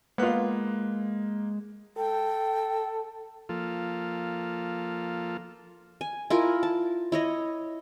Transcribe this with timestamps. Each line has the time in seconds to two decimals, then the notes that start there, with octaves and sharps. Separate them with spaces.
0.18 G#3 A#3 B3 F4 F#6
1.97 A4 G5
3.49 F3 A#3 F4 A4
6.01 G#5
6.30 E4 F4 A#4 G#5
6.63 A5
7.12 E4 C#5 D#5